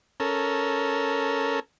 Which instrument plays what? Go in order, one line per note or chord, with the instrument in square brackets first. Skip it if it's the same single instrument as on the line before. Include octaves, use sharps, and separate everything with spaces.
[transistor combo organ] C#4 A4 A#4